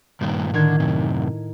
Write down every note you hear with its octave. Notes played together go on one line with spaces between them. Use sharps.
G2 A#2 D#3
A2 D3 D#3 G#6
F#2 C3